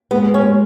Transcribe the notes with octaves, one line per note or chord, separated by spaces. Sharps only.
G#3 B3
C#4
G#3